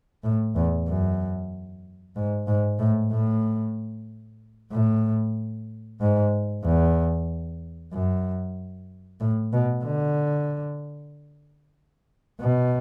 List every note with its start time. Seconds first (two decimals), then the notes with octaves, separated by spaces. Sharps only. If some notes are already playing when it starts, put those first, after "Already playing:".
0.24 A2
0.56 E2
0.88 F#2
2.16 G#2
2.47 G#2
2.79 A2
3.12 A2
4.72 A2
6.01 G#2
6.65 E2
7.93 F#2
9.21 A2
9.53 B2
9.85 D3
12.41 B2